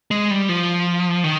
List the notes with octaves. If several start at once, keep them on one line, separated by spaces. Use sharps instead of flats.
G#3
G3
F3
D#3